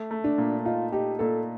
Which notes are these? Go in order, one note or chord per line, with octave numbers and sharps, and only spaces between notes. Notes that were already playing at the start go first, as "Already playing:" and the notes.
Already playing: A3
A3
D4
A#2
D#4 F4
D#4 G4
A#2 A4